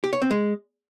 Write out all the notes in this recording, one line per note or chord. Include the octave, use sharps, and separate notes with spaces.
G4
C#5
C4
G#3